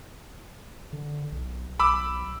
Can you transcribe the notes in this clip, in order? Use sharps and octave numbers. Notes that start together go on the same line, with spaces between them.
D3
B1
B1 B5 D6 E6